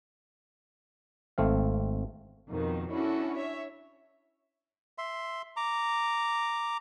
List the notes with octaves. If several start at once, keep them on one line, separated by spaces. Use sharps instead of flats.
G#1 A3 C4 F5
F2 B2 D#3
C#4 D4 E4 F#4 A4
C#5 E5
E5 C6
A#5 D6